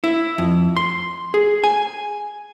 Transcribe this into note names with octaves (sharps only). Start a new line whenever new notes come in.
E4
F2
C6
G#4
G#5